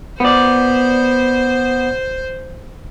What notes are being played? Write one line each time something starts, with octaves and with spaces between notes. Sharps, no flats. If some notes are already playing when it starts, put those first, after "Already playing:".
B3 C5 D5